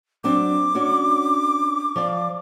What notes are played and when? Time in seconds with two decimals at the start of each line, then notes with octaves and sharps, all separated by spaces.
0.24 F#3 C4 D4 D6
0.75 C#4 D4 F#4
1.96 F3 D5 F5